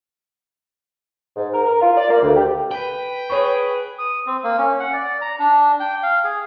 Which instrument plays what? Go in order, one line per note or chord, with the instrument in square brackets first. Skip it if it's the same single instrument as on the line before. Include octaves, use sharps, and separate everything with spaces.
[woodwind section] G#2
A#4
A#4
F4
D5
A#3
D2
G4
[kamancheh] B4 [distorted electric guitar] G5
[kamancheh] G#4 [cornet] B4 [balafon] C#5 B5 C#6
[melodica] D#6
C4
A#3
C#4
F#5
D5
A#5
D4
G5
F5
G#4